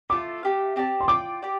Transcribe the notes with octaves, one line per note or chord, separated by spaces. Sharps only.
A3 F4 A4 D6
A3 D4 G4 F5
C4 G4 D5 A5
C6
F4 D5 G5 D6
G4 D5 G5